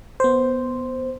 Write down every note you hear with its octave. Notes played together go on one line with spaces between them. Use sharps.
B3 C5